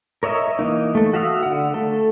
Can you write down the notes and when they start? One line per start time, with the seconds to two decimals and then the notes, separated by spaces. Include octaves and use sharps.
0.23 A#4 C#5 D#5 E5
0.59 E3 A#3 D#4
0.95 A3 A4
1.13 F#4 E5 F5 D#6 E6
1.43 D3 F#5
1.74 A3 A4